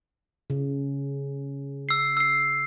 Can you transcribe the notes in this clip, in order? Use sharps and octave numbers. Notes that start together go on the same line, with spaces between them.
C#3
E6 C7
E6 C7